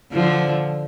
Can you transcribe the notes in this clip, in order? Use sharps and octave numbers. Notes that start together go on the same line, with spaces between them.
D3 F3